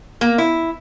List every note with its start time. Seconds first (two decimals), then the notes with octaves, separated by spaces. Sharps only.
0.21 A#3
0.38 E4